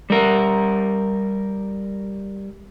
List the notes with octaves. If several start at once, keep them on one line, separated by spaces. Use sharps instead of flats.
G3 A#4